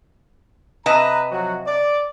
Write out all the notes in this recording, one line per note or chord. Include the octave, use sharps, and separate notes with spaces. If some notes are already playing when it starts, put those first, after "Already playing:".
C3 B4 D#5 A5 A#5
F3 F#3 F#4
D5